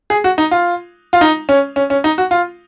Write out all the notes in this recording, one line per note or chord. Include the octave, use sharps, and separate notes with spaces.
G#4
F#4
D#4
F4
F4
D#4
C#4
C#4
C#4
D#4
F#4
F4